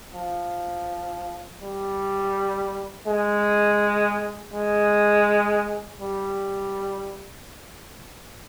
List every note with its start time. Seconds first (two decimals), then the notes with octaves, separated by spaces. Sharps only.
0.14 F3
1.62 G3
3.07 G#3
4.54 G#3
6.01 G3